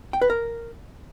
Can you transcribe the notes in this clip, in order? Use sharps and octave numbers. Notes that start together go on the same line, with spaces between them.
G5
B4
A#4